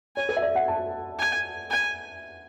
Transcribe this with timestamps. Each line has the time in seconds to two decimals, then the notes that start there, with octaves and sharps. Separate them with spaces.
0.16 C#5 G#5
0.29 B4
0.37 E5
0.42 D5
0.55 F#5
0.68 A5
1.19 G#5
1.70 G#5